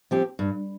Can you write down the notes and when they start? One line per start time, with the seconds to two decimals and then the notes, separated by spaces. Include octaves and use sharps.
0.11 F3 C4 G4
0.39 G2